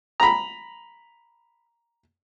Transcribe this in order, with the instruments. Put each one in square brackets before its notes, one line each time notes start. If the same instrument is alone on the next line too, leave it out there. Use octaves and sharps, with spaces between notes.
[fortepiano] A#5 B5